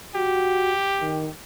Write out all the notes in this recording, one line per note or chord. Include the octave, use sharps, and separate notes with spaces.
F#4 G4
D#3